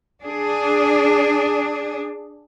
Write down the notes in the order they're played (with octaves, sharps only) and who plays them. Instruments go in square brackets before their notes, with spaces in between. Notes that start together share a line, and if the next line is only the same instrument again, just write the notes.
[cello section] D4 G#4